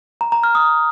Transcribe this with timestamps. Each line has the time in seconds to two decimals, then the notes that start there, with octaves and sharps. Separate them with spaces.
0.21 A#5
0.32 A#5
0.44 F6
0.55 D#6